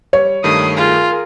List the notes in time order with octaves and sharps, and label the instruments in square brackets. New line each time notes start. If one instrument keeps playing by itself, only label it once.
[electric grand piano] G3 [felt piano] C#5
[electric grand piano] G2 D#3 A3 [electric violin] D#6 C7
[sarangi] F4 [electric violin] G#4 A#4